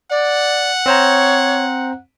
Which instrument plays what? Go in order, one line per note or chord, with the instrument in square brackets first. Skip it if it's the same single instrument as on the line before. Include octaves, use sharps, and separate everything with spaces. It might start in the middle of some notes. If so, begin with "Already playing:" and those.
[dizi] D5 [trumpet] F#5
[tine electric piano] C4 C5 A#5 [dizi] C#5